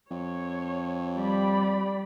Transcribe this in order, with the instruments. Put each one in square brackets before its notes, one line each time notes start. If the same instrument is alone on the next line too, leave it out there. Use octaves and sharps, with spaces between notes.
[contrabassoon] F2 [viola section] C#5
[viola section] G3 D5 B5